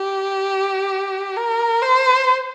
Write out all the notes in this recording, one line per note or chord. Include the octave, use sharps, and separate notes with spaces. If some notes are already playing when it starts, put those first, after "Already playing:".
Already playing: G4
A#4
C5